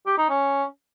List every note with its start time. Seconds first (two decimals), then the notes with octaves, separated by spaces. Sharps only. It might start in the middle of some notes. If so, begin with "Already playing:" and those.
0.06 G4
0.18 D#4
0.30 C#4